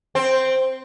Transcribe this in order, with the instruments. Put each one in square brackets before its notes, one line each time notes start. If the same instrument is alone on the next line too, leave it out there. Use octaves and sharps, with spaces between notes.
[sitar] C4